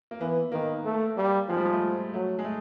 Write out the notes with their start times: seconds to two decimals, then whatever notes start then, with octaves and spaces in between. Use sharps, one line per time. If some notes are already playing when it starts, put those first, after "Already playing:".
0.11 A#3
0.20 E3 B3
0.52 D#3 A#3
0.85 A3
1.17 G3 A#3
1.49 F3 G#3
1.57 G3
1.65 G#3
1.73 A3
2.14 F#3 A3
2.39 G#3
2.45 A3